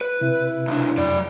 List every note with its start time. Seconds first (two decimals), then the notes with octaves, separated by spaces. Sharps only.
0.01 B4
0.21 C3 E4
0.67 B1 D4
0.98 F2 F#3 D5